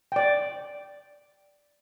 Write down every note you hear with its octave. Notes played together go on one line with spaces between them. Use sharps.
D5 G5